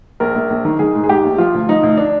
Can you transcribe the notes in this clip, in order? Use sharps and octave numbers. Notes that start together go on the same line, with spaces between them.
A#1 A#4
A#1
A#1
D#3
D#3 G#4
G#2
G#4
G#2 G4
A#1
F3 F4
D2
F3 D#4
D2
D4